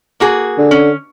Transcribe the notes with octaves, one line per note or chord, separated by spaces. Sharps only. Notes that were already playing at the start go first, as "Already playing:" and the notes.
A#3 F#4 G#4
D3
C#4